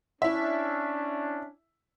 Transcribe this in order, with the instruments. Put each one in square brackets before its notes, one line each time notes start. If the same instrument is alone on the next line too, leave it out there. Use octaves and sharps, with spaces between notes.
[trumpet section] C#4 D4 [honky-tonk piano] E4 E5